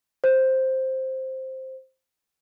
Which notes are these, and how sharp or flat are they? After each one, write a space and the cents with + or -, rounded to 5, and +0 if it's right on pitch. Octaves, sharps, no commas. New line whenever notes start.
C5 +5